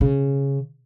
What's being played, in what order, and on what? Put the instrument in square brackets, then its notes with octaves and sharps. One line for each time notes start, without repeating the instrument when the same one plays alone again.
[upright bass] C#3